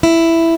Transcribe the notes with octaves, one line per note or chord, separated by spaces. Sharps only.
E4